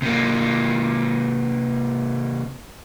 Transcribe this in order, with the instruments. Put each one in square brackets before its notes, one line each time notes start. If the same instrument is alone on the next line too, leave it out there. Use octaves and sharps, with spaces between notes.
[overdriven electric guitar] C3 A#3